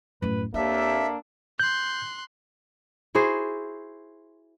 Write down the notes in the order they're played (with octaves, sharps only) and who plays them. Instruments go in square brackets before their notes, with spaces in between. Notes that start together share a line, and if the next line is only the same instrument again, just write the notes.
[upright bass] F#2 A2 [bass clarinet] B4
[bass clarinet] D#2 [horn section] A#3 D4 A4 [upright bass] C4 [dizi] E5
[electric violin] C6 F#6 [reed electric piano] G6
[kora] E4 F#4 G#4 C5